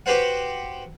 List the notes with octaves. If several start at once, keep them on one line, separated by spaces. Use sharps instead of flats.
F#4 G4 B4 C5 F#5